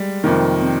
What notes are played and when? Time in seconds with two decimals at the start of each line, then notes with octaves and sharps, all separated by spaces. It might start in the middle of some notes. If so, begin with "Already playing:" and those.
Already playing: G3 G#3
0.23 F2 C3 D#3 A#3
0.60 C4